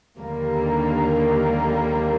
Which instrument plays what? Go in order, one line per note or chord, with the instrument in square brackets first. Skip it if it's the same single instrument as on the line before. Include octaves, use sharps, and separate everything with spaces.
[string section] D#2 D3 G3 A#3